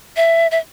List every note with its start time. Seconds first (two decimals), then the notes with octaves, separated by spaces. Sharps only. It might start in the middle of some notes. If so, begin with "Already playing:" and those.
0.16 E5
0.51 E5